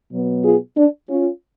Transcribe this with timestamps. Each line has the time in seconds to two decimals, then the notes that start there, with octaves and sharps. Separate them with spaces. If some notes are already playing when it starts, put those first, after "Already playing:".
0.12 B2 F#3 B3
0.44 F4 G#4
0.77 D4
1.08 C#4 F4